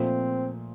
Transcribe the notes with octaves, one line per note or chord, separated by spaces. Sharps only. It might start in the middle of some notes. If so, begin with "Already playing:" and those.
Already playing: A#2 F3 A3 C4